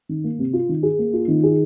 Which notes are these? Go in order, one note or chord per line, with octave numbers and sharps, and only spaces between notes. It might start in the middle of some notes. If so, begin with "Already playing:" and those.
D#3
A#3
C3
F4
D#3
G#4
A#3
F4
D#3
G#4